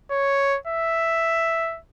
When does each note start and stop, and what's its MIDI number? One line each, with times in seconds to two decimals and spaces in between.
0.11 0.58 73
0.67 1.79 76